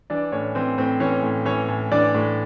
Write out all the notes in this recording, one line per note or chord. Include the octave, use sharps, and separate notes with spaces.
E3 D4 D5
A2 C#4 C#5
E3 C4 C5
A2 C4 C5
E3 C#4 C#5
A2
E3 C#4 C#5
A2
E3 D4 D5
A2